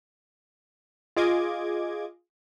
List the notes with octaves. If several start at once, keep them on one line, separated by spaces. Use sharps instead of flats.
F4 G#4 D#5 D6 G#6